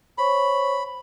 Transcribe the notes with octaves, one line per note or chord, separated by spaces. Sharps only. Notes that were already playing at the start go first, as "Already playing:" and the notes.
C5 C#5 B5 C#6